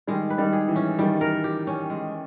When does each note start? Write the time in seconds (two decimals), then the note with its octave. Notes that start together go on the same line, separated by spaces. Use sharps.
0.07 D#3 G3 G#3
0.30 B4
0.38 D#3 G3
0.53 G#4
0.68 E3
0.76 C#4
0.99 D#3 G3
1.21 A#4
1.44 G4
1.67 C#4
1.90 G#3